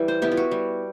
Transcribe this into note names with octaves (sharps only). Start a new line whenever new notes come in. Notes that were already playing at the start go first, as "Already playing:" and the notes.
Already playing: E3 G3
C5
B3 E4 G4
F4
F#4
G3